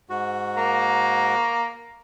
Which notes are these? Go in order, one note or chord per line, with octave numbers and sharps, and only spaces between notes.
G#2 F#4
A#3 A#5